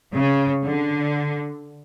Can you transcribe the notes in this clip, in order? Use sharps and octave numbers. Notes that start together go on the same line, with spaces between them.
C#3
D3